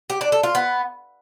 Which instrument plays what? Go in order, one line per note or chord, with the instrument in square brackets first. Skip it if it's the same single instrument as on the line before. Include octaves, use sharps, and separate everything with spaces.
[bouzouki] G4
D4
A4
F4
B3